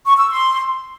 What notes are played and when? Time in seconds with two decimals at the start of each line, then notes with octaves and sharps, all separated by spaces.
0.06 C#6
0.18 E6
0.29 C6